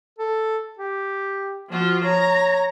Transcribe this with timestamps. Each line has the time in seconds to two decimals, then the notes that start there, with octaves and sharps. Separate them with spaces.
0.19 A4
0.79 G4
1.70 F3 F4 F#4
2.05 C#5 A#5